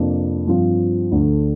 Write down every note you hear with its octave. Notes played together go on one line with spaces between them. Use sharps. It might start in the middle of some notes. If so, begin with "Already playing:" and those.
Already playing: F2 C3 F3 A#3 D4
G2 F3 C4 F4
D2 D3 A3